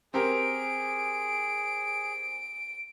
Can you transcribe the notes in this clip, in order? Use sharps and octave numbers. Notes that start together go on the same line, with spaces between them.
C4 G4 G#4 A#4 D7